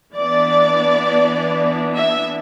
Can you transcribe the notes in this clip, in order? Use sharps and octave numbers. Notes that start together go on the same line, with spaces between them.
E3 B3 D4 D5
E5